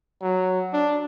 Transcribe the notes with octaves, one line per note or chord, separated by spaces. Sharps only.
F#3
D4